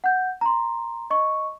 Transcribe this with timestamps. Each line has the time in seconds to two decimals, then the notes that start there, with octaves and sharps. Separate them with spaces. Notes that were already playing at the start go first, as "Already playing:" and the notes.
0.04 F#5 G6
0.41 A#5 C6
1.10 D#5 C#6